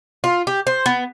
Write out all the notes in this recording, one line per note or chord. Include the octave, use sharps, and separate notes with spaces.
F4
G4
C5
B3